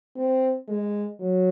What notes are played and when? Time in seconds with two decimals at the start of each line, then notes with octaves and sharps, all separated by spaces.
0.16 C4
0.68 G#3
1.20 F#3